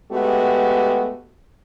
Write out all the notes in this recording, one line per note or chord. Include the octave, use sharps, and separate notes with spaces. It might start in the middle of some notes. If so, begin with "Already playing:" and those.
G#3 A3 B3 F#4 G4